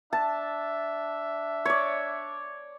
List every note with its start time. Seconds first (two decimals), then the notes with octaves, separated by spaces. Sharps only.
0.13 D4 E5 A5
1.65 C#5 D5